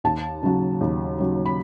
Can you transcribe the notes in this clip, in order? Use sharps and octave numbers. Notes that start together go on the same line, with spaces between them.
D#2 A5
C#3 F#3
D#2
C#3 F#3
B5